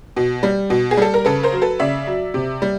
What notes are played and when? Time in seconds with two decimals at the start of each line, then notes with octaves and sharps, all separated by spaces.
0.17 B2
0.43 G3
0.70 B2
0.91 G#4
0.97 G3 A4
1.14 A#4
1.25 C#3 A4 B4
1.43 A#4 C5
1.52 F#3
1.61 A4 B4
1.79 C#3 D5 E5
2.07 F#3
2.34 C3
2.62 G3